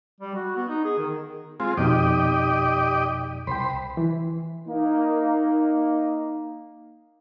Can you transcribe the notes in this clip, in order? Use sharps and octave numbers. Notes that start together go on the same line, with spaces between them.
G3
F#4
B3
D#4
G#4
D#3
G#3 C4 F4
F2 B2 D#4 G4 D5 D#5
C2 C5 G5 B5
E3
A#3 D#4